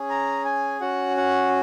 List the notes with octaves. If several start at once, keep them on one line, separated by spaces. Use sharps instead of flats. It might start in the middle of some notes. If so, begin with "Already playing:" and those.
Already playing: C#4 G#4
A#5
G#5
C#4 F#4 F#5
F#5